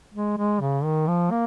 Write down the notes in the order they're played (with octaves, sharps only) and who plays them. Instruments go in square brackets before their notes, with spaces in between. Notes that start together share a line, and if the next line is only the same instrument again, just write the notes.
[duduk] G#3
G#3
C#3
D#3
F3
A#3